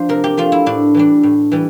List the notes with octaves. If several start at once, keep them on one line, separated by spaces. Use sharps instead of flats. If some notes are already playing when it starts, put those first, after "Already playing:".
Already playing: F3 D4 C5
C3 A#4
G4
F3 A3 D4 F4
E4
A2 D4
E3 G3 D4
A2
E3 G3